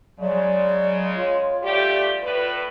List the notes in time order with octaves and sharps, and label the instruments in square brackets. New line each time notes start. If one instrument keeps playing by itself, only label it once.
[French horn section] C#3 G#3 [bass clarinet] F#3 [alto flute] D5
[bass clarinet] F4 [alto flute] C#5
[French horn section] G3 A3 G4 [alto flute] D5
[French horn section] A2 B4